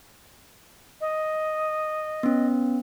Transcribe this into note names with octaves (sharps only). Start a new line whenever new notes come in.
D#5
B3 C#4